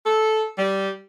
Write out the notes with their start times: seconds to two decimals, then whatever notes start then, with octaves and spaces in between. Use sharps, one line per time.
0.06 A4
0.58 G3